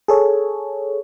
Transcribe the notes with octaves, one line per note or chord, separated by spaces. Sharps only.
G#4 A4 C#5